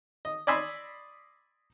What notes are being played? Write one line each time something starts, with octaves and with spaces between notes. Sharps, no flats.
D#5
D5 D#5 G#5 B5 C6 E6